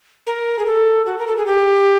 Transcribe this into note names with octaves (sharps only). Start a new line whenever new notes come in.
A#4
G#4
A4
F#4
A#4
A4
G#4
G4